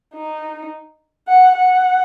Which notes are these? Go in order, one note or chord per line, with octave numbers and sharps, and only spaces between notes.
D#4
F#5
F#5